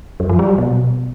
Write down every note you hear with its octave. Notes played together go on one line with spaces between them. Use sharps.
F#2
F3
G3
F#3
B2